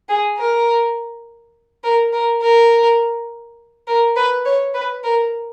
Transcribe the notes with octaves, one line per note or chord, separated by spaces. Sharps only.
G#4
A#4
A#4
A#4
A#4
A#4
B4
C#5
B4
A#4